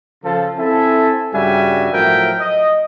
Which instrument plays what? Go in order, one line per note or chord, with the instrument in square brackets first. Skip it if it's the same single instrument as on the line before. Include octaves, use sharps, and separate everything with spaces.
[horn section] C#3 F3 A4
C4 E4 A4 E5 G#5
G2 C#3 G3 F#4 E5 G#5
A2 F3 F#3 A#4 E5 G5
D#5